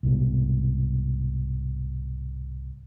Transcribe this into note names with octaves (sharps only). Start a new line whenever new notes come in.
C2 G#2 B2